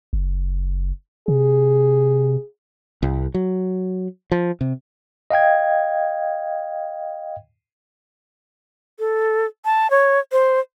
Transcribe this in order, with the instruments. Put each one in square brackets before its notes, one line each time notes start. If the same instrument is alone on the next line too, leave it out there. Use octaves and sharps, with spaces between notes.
[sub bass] F#1
[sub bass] C3 [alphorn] G#4
[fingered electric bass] C2
F#3
F3
C3
[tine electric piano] D#5 F5 G5 G#6
[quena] A4
A5
C#5
C5